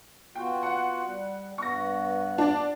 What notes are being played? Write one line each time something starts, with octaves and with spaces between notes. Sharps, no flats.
B3 F4 F#4 G5
F#5
G3
G2 B3 C#6 A#6
D4 D5